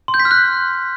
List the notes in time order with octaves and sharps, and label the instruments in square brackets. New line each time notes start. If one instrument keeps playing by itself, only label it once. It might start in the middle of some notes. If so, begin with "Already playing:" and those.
[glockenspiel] C6
G6
B6
F6
F#6